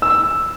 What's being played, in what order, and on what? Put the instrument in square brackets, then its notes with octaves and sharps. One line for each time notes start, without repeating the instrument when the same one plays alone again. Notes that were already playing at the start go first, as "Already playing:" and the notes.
[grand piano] E6